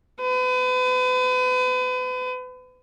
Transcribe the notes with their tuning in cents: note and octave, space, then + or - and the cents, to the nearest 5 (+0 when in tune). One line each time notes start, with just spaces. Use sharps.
B4 +40